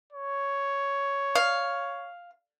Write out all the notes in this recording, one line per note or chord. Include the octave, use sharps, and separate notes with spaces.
C#5
F5